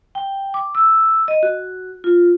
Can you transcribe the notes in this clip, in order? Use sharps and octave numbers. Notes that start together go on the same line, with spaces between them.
G5
D6
E6
D#5
F#4
F4